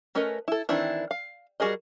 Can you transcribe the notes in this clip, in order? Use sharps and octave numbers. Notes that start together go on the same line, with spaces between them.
A3 C#4 A#4 B4 D#5
E4 A4
D#3 E3 C4 D4 E4
F5
G3 F#4 G#4 A#4 D#5